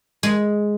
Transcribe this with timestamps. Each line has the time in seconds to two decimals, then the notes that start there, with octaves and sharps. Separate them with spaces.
0.23 G#3